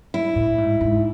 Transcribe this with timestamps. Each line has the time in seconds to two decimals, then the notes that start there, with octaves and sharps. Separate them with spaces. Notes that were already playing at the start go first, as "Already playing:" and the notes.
0.14 E4
0.36 A2
0.58 G#2
0.81 G#2